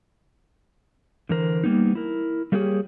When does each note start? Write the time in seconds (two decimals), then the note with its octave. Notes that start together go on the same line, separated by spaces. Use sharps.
1.29 D3 E3 A#4 C5
1.64 G3 A#3 B3 D#4
1.95 E4 A#4
2.52 G3 A3 A#3 G4 G#4 C#5